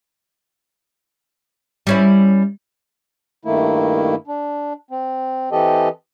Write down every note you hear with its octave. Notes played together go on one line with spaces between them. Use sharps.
G3 C#4 E4
G2 D#3 A3 A#3 E4
D4
C4
E3 C4 G4 A4 D#5